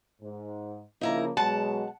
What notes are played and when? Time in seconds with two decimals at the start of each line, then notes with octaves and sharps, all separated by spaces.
0.21 G#2
1.01 C#3 F3 A#3 D#4 E4 A#5
1.37 B2 F#3 G#3 F#5 A5